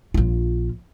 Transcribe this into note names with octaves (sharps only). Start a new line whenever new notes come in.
A#1 F4